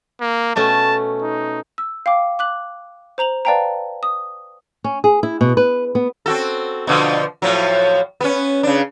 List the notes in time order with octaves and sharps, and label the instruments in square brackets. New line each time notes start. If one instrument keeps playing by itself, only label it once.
[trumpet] A#3
[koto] B2 A3 C#4 [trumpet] A5
[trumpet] D#4
[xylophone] E6
F5 G5 D6
D6 F#6 F#7
C5 A#5 F7 F#7
B4 D5 F5 G5 A5 A#5
D#6
[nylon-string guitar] C#4
G#4
E4
B2
B4
B3
[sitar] C4 F#4 A4
B2 D3 F3
A2 F3 F#3
B3 C#4
C#3 D4